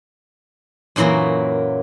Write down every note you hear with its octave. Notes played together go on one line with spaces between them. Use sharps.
F#2 A#2 E3 F#3 A#3